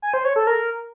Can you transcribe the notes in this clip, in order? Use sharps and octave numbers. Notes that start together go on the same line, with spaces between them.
G#5
C5
C#5
A4
A#4